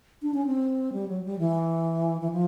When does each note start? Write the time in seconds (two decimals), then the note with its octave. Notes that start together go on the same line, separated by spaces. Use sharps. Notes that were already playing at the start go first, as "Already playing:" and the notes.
0.22 D4
0.34 C#4
0.46 C4
0.93 G3
1.08 F#3
1.24 G3
1.39 E3
2.21 E3
2.32 F3